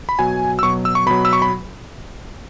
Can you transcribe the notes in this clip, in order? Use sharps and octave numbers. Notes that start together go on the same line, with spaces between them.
B5
B2 F#3 G#5
E6
B2 F#3 C#6
E6
C#6
B2 F#3 B5
E6
C#6
B5